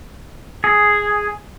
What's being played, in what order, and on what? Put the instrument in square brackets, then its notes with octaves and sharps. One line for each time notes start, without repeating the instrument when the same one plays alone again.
[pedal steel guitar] G#4